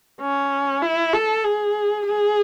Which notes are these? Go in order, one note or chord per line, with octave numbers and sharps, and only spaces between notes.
C#4
E4
A4
G#4
G#4